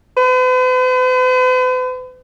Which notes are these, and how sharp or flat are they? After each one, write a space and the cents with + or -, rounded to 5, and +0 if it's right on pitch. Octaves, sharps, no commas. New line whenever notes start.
B4 +45